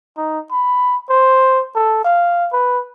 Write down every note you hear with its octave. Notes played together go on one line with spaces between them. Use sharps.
D#4
B5
C5
A4
F5
B4